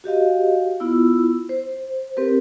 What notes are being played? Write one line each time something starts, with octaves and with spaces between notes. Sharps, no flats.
F#4 G4 D#5 F5
B3 E4 F4 E6
C5
C4 G4 A#4 B4